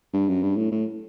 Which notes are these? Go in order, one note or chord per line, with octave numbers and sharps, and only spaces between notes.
G2
F#2
G2
A2
A2